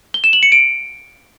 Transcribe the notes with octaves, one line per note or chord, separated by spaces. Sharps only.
G7
E7
F#7
C#7
D7